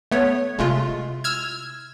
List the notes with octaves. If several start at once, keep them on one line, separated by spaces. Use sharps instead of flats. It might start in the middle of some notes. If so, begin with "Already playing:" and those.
A3 B3 C#5
C3 G#3 A3 E4 F4
E6 F6 G#6